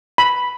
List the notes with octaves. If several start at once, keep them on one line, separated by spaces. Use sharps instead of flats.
B5